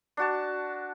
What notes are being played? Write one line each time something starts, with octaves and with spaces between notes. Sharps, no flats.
D4 F#4 A5